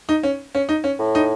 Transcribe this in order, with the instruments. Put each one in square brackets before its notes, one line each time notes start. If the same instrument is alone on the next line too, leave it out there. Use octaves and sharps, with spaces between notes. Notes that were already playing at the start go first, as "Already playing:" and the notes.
[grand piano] D#4
C#4
C#4
D#4
C#4
[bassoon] A2
[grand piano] D#4